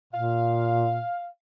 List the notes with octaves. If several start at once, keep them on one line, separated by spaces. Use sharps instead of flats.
A#2 F5